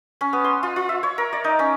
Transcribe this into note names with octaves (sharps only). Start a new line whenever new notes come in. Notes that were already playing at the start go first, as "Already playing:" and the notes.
C#4
B3
C6
F4
F4
E5
C#5
A#4
D5
D#4
C#4